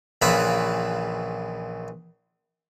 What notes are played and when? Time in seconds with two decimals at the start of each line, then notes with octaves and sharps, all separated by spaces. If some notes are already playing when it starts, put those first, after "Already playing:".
0.22 A#1 C#3 E3 F4 B4 E5